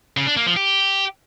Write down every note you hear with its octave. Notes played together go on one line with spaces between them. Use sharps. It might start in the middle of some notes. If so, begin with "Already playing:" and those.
C#3
D4
A#3
F3
G4